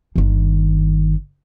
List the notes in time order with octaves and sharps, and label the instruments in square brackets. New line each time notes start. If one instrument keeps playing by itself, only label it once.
[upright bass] G1 D#3